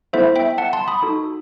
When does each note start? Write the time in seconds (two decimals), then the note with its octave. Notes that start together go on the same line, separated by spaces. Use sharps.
0.13 B3 E4 A4 C5 E5
0.36 E5 G5
0.58 F#5 A5
0.73 A5 C6
0.88 B5 D#6
1.02 D#4 F#4 A4